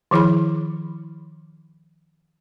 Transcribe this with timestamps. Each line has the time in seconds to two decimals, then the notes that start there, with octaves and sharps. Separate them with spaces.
0.11 D#3 F3 E4 G#4 B5